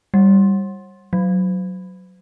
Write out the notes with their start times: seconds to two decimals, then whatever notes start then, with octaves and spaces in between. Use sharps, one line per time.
0.14 G3
1.13 F#3